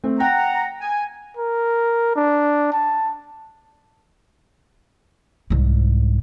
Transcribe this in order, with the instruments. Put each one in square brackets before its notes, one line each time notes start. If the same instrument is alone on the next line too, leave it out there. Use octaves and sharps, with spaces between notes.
[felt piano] A3 C4
[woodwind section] F#5 A#5 [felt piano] G5
[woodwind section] G#5
[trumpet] A#4
D4
A5
[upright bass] C2 G#2